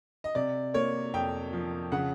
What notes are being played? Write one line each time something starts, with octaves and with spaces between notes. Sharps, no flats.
D#5
C3 D5
A#3 C#5
F2 G5
F3
C#3 F#5